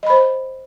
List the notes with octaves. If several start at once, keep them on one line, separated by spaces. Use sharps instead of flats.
C5 D#5 B5